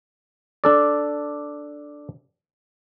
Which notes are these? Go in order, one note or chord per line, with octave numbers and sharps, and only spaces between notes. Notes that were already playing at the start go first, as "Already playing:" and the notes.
D4 A4 D5